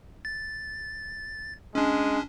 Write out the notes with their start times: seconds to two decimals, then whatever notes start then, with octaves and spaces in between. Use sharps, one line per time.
0.25 A6
1.75 G#3 C#4 D4